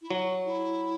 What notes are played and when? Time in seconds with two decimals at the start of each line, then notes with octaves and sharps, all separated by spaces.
0.02 E4
0.10 F#3 F#4
0.46 E4